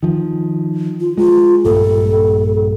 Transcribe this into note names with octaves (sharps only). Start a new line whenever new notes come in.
D#3 F3
F4
G#3 F4
A#1 G2 A#3 A4